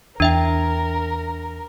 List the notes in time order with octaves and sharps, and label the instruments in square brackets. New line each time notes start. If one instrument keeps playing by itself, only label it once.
[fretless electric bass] E2 [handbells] D4 E5 G5 [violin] A#4